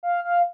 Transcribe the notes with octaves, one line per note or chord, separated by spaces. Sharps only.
F5
F5